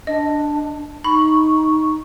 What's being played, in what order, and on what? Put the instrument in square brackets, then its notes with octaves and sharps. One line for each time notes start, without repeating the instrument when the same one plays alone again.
[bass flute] D4 [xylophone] D#5
[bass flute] D#4 [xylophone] B5 [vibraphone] C#6